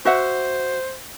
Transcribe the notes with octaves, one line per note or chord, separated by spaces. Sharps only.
F#4 C5 E5 F#5